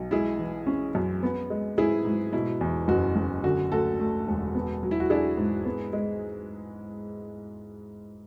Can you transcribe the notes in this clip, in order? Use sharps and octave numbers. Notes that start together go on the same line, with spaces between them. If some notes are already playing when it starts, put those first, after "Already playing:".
Already playing: B1
G#3 E4 G#4
E3
C#4
F#2
B3
G#3
G#2 E4 G#4
G#2
B2 E4
E2
F#1 F#4
F#1
D3 F#4
D2 F#4 A4
A3
E1
B3
F#3
E4
F#4
D4 E4 G#4
G#2
B3
G#3